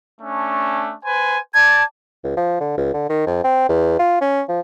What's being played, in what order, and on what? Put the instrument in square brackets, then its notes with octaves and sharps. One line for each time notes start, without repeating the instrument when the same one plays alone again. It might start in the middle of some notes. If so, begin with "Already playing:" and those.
[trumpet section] A3 C#4 D4
B4 C5 G#5
[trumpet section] D5 A5 [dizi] G#6
[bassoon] C#2
F3
D3
C#2
D3
D#3
F2
C4
E2
F4
C#4
F3